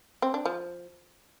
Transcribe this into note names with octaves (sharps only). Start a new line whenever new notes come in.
C4
D4
F3